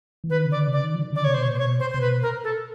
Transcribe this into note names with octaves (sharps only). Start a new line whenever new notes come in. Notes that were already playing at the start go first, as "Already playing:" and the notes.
E3
D#3 B4
C#3
D3 D5
C3
C#3 D5
D#3
F3
D3
D#3
C#3
D3 D5
C3 C#5
B2 C5
C#5
A#2
C5
B2 C#5
C5
C3 C5
B2 B4
A#4
A4